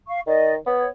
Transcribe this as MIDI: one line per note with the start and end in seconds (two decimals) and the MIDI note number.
0.07 0.20 77
0.07 0.20 85
0.27 0.56 51
0.27 0.53 74
0.27 0.53 75
0.66 0.86 59
0.66 0.89 73